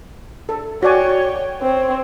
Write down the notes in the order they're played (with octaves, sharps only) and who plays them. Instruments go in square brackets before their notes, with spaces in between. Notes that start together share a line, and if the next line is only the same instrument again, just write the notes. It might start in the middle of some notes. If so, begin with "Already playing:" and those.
[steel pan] A4
[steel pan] F#4 D5 G#5 [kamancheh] C#5 G5
[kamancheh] C4 C#5